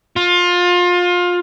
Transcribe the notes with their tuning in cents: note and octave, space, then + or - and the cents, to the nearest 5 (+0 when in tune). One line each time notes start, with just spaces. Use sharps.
F4 +25